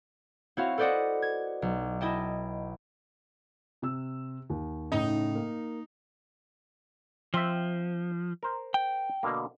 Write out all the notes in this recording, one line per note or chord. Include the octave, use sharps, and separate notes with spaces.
C4 E4 F#4 C#5 F5
A4 B4 C5 D5 D#5 F#5
G#6
B1
E4 D#5 G5 A5
C3 E6
D#2
A2 C#3 D#4
A#3
F3 C4 E5
A#4 C5
G5
B2 D3 A#3